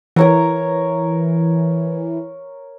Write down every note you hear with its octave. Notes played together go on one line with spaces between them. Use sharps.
E3 A#4 C#5 A#5